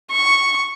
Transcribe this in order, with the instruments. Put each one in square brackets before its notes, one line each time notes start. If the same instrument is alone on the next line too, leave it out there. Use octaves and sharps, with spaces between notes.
[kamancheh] C#6